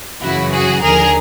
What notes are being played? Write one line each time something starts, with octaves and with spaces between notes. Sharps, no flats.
F#2 C#3 E3 E4 F#4
F#4 G#4
D#2 D3 F3 G#4 A#4